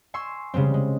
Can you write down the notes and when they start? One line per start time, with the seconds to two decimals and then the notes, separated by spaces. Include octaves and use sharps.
0.14 G#5 C6 C#6 E6
0.54 C#3 G3 G#3 C4
0.74 G#3